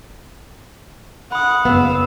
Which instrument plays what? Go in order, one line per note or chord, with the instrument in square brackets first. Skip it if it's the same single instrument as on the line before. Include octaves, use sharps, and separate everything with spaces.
[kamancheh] F#5 [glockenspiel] B5 D#6
[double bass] F#1 [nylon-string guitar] B3 [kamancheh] F5 E6